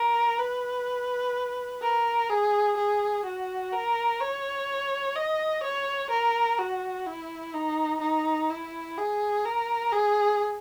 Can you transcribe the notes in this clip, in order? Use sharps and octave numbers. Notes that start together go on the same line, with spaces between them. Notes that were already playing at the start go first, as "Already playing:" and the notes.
Already playing: A#4
B4
A#4
G#4
G#4
F#4
A#4
C#5
D#5
C#5
A#4
F#4
E4
D#4
D#4
E4
G#4
A#4
G#4